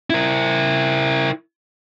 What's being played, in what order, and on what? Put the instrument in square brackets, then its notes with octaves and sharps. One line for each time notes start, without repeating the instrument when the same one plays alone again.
[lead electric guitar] E4 A#4